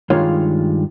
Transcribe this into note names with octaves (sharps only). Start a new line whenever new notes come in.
G2 D#3 G#3 F4 C#5 F5